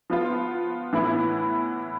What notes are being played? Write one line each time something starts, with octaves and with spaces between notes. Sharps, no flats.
F3 B3 F4
A2 E3 B3 E4